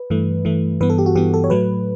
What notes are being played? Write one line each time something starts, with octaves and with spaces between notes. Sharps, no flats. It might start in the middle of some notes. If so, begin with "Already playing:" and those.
Already playing: B4
G2 E3 A3
G2 E3 A3
G2 E3 B3 B4
A4
G4
F#4
G2 E3 B3 G4
A4
C#5
A2 F#3 A3 B4